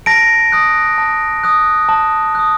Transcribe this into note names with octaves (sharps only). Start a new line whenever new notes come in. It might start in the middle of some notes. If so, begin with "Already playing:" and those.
A5 A#6 D7
D#6 F#6
A5
D#6 F#6
A5
D#6 F#6